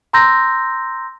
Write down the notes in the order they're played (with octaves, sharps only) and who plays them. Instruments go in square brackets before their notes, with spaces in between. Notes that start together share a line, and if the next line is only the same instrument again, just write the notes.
[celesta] A#5 C6 E6 G6 A#6